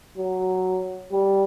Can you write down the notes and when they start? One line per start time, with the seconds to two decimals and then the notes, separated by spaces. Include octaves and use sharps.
0.17 F#3
1.12 G3